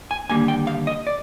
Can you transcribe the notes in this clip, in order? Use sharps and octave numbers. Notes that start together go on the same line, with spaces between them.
G#5
D#2 D3 G3 A#3 G#5
G5
F5
D#5
D5